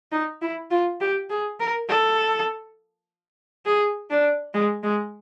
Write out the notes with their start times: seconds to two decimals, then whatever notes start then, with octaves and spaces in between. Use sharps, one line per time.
0.12 D#4
0.42 E4
0.71 F4
1.01 G4
1.30 G#4
1.60 A#4
1.89 A4
3.66 G#4
4.10 D4
4.54 G#3
4.83 G#3